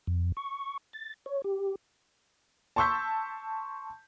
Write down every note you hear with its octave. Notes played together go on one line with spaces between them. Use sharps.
F2
C#6
A6
C#5
G4
A5 C6 C#6 E6 G6 B6